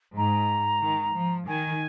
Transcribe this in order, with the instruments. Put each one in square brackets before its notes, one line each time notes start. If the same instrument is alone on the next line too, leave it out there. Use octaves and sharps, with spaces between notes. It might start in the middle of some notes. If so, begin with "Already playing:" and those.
[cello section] G#2 [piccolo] A#5
[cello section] D#3
F3
[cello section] D#3 [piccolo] G#5